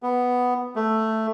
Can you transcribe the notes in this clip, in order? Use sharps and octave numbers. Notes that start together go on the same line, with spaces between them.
B3
A3